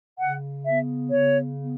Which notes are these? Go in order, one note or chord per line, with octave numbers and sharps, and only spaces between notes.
C#3 F#5
B3 E5
C#3 C#5
B3